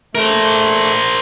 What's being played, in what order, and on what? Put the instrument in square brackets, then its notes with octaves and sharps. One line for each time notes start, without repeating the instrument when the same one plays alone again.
[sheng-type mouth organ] A3 [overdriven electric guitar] A#4 C5